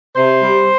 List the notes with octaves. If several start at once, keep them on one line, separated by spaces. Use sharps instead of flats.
C3 C5
G3